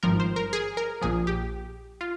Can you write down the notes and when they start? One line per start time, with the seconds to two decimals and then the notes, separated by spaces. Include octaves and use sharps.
0.03 G#1 G2 F3 A#4
0.20 C5
0.36 A#4
0.53 G#4
0.77 A#4
1.02 A#1 A#2 F3 G#4
1.27 G4
2.01 F4